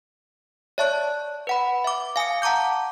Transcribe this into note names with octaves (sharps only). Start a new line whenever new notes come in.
C#5 D5 E5 A5 C#6 F#6
B4 F#5 B5
E5 D6
F5 G#5 D#6 C#7
F#5 A5 A#5 D6 G6